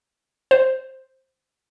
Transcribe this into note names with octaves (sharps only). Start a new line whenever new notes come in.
C5